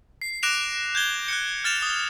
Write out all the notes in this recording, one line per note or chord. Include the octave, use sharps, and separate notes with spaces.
C7
D6 F#6 A#6 D7 E7 F7
G6 G#6 G7
F#6 G6 C#7
F6 A6 E7 F7
D#6